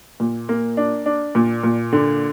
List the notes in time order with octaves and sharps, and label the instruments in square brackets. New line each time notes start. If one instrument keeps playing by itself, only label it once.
[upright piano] A#2
A#3
D4
D4
A#2
A#2
D3